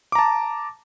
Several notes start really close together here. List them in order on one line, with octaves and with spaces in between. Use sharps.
D6 A#5 A5